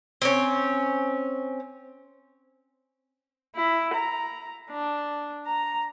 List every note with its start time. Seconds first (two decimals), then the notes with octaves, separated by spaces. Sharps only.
0.22 C4 C#4
3.55 E4
3.94 A#5
4.70 D4
5.46 A#5